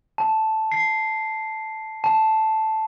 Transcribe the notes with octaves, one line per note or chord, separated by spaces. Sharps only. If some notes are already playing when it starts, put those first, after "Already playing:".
A5
C7
A5